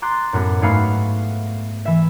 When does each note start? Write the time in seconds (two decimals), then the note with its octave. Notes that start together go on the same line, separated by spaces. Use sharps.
0.02 A#5 C6 D6 F#6 A6
0.33 F#2 A2 B3
0.62 G#2 A3 G#4 F5 F#5 B5
1.85 E3 E5